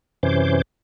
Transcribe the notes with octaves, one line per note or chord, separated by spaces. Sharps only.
F#2 C3 E3 C#4 C5 D6